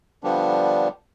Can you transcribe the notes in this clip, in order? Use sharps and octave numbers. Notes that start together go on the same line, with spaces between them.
D3 F3 G3 B3 D4